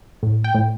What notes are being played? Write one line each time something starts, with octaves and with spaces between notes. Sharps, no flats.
A2
G5
A2